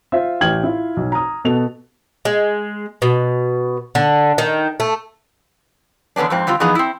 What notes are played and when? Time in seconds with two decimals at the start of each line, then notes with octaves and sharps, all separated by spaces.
0.12 F4 C5 E5
0.41 A1 G5 F6 G#6 F#7
0.63 E4 F4
0.97 B1
1.12 A#5 D#6
1.44 B2 B3 A4 F7
2.25 G#3
3.02 B2
3.95 D3
4.38 D#3
4.80 A3
6.16 E2 D3 B3 C#4 D4
6.30 F2 G#2 C4
6.47 D3 G3 C4 F4
6.60 E3 F3 B3 D#4 G#4 D#5
6.75 C4 E4